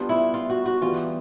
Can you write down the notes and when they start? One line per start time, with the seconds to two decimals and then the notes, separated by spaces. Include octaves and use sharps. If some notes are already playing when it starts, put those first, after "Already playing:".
Already playing: G3 B3 D4 F4
0.09 E4
0.34 F4
0.50 F#4
0.66 F#4
0.81 E3 G3 B3 F4